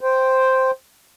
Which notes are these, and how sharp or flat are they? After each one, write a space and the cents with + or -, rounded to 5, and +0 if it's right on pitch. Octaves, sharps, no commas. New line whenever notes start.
C5 +0 G5 +0